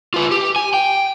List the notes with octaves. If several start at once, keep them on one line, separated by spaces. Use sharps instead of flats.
F4 B4
G4
G#5
G5